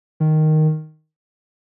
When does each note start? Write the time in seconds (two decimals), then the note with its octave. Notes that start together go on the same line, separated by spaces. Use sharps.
0.20 D#3